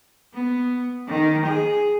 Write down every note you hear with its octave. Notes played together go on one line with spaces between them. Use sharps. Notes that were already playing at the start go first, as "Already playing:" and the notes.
B3
D#3
G#4